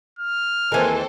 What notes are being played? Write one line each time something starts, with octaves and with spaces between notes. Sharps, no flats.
F6
D#2 E3 G#3 C4 A4 A#4 C5 G#5